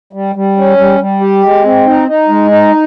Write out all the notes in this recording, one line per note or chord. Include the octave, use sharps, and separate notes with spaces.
G3
G3
C#4
G3
G3
G4
G#3
C4
D#4
D#4
G#3
D#4